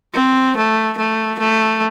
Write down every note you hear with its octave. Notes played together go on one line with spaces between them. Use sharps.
C4
A3
A3
A3